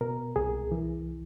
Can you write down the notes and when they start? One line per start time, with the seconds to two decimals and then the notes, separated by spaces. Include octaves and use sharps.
0.01 B2 A#4
0.36 C2 G#4
0.72 E3